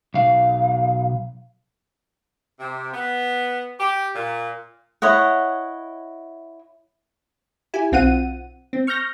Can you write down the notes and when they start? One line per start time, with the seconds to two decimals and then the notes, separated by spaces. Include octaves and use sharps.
0.14 B1 F5
2.60 C3
2.93 B3
3.79 G4
4.14 A#2
5.02 E4 C#5 D#5 F#5
7.74 E4 G4 G#5
7.92 B1 C4 F4 F#5 D#7
8.73 C4
8.87 C#6 F6 G6 A#6